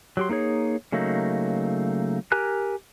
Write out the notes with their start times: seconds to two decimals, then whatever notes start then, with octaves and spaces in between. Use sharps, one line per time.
0.17 F#3 G4 C6
0.29 A#3 D#4 G#4 C#5
0.92 C#3 F#3 A3 A#3 D#4
2.32 G4 A#4 G#5 A#5 F#6